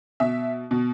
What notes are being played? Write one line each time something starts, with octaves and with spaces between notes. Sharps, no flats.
B2 E5
B2